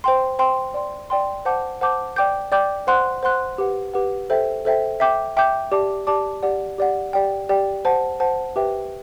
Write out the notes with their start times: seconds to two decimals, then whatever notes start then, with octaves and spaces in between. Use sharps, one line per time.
0.04 C5 G5 C6
0.39 C5 G5 C6
0.74 D5 G5 C6
1.10 D5 G5 C6
1.45 C5 F#5 A5 D6 G6
1.81 C5 F#5 A5 D6 G6
2.16 D5 G5 D6 G6
2.52 D5 G5 D6 G6
2.87 C5 F#5 C6 F#6
3.23 C5 F#5 C6 F#6
3.58 G4 B4 F#5
3.94 G4 B4 F#5
4.30 A4 C5 E5 G5
4.65 A4 C5 E5 G5
5.00 E5 G5 D6 G6
5.37 E5 G5 D6 G6
5.72 G4 D5 A5 D6
6.07 G4 D5 A5 D6
6.43 G4 D5 F#5
6.78 G4 D5 F#5
7.13 G4 D5 G5
7.49 G4 D5 G5
7.85 C5 F#5 A5
8.20 C5 F#5 A5
8.56 G4 B4 E5 G5